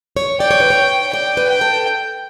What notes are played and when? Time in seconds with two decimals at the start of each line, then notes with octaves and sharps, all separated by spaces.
0.17 C#5
0.40 D5 G5
0.51 C#5
0.60 B4
0.70 C#5
1.13 D5 G5
1.37 B4
1.49 G5
1.61 A4